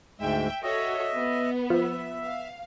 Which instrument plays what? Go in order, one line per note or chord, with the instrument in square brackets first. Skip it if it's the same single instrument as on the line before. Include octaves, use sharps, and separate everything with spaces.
[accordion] D2 G#2 G#3 [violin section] E5 G5
[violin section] F#4 A4 C#5 [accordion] D#5 E5
[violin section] B3
[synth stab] F3 [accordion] E5
[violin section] F5